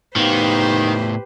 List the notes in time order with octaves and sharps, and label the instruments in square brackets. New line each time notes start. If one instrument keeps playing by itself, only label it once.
[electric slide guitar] A2 B3 F5 [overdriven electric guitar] D#3 [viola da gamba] G4 B4 C5